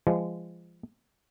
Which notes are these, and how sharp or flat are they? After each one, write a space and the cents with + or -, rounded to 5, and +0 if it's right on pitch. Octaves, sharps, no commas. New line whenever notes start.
F3 -30 G#3 -30